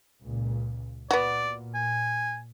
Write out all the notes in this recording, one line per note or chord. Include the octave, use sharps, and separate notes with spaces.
C#2 A#2
A#2 B3 F#4 D5
G#5